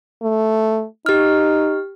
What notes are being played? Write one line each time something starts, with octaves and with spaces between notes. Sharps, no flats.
A3
D#4 G4 F6